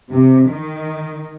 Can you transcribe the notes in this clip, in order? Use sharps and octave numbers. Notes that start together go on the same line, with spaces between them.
C3
D#3